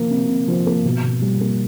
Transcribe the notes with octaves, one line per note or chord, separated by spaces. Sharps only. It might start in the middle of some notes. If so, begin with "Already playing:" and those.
Already playing: C3 F3 A#3
C3
C3
F3
A#3
B2
B2
G3
A#3